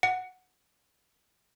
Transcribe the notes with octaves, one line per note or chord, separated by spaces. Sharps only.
F#5